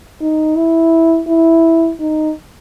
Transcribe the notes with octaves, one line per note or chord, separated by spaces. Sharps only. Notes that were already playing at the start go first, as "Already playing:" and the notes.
D#4
E4
E4
D#4